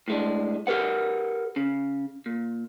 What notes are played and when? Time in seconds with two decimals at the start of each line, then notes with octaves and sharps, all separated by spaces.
0.08 A2 G#3 D4
0.67 G4 A#4 B4 F#5
1.56 C#3
2.26 A#2